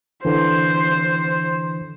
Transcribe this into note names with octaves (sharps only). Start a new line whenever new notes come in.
D3 E3 C5